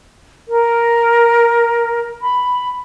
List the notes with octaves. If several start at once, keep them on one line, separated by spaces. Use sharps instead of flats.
A#4
B5